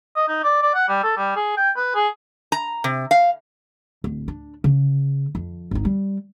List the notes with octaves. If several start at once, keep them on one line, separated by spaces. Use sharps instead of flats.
D#5
D#4
D5
D5
F#5
G3
A4
G3
G#4
G5
B4
G#4
A#5
C3
F5
D1
D4
C#3
F2
G#1 D#4
G3